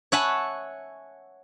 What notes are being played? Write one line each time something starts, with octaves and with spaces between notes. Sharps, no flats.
C#5 E5 F#5 G#5 A5 B5